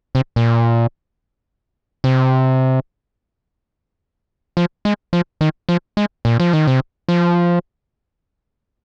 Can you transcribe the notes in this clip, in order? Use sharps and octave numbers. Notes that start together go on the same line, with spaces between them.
C3
A#2
C3
F3
G#3
F3
D#3
F3
G#3
A#2
F3
D#3
C3
F3